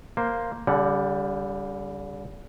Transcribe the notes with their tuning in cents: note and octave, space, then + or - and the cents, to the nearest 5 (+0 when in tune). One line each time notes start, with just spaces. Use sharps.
A#3 +0 C5 +0
D3 -45 G3 +0 F#5 +0